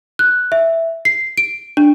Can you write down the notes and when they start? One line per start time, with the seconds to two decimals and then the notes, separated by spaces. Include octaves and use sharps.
0.19 F#6
0.52 E5
1.05 C7
1.37 D7
1.77 D4